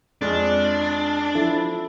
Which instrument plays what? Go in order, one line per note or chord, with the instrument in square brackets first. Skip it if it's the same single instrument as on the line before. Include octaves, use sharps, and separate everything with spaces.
[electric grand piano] F2 G#3 F#6 [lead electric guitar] D4
[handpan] F3 E4 A4